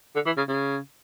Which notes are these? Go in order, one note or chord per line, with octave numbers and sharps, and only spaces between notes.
D3
E3
C#3
C#3